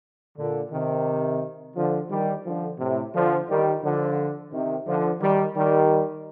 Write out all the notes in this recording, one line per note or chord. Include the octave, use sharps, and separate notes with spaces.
A#2 D3
C3 D#3
D3 F3
D#3 G3
D3 F3
A2 C3
D3 F3
D#3 G3
D3 F3
C3 D#3
D3 F3
D#3 G3
D#3 G3